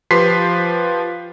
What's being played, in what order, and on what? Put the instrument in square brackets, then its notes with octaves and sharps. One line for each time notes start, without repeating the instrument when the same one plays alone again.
[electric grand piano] F3 G4 B4 C6 B6 C7